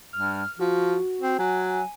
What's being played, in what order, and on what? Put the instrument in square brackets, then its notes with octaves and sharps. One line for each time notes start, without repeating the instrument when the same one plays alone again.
[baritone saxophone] G2 [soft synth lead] F6
[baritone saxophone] F3 [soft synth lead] F#4
[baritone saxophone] C4
[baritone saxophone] F#3 [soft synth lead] G#5